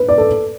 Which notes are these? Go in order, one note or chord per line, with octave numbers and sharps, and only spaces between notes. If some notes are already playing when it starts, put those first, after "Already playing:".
Already playing: B4
D5
A4